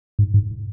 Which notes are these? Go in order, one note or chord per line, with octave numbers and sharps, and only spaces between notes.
G#2
G#2